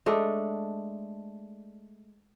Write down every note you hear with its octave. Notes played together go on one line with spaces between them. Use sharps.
G#3 A3 D4